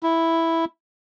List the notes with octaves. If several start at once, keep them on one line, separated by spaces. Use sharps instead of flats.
E4